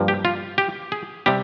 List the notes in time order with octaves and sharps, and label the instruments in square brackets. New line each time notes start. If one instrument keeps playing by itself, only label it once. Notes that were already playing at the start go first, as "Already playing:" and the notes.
Already playing: [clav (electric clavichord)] G2 F3 A#3
G4
F4
G4
G#4
C3 G3 G4